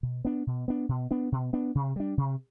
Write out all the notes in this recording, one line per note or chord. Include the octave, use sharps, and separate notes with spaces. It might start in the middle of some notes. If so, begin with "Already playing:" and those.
B2
B3 D4
B2
B3 D4
B2
B3 D4
B2
B3 D4
C3
G3 D4
C3